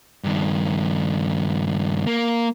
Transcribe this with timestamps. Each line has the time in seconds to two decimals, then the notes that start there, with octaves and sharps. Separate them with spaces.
0.24 G2 D#3
2.07 A#3